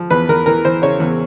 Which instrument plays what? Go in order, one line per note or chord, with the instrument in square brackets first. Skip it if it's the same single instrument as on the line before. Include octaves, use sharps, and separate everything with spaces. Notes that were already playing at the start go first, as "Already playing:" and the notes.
Already playing: [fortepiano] F3
E2 B4
E2 A#4
E3 A#4
E3 C5
C#3 C#5
E2